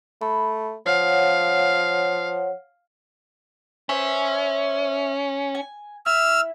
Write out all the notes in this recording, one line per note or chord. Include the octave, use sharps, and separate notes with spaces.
A3 B5
F3 C#5 F5 F#5
C#4 B4 C5 E5
G#5
E4 E6 F6